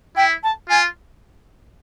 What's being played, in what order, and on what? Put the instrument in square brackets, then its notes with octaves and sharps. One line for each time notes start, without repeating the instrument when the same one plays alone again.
[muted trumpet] E4 [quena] G5
[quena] A5
[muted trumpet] F4 [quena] G#5